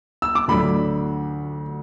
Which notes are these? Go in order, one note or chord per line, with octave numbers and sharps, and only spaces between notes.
E6
D6
D2 D3 F#3 B5